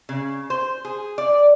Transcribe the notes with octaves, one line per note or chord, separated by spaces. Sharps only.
C#3
C5
G#4
D5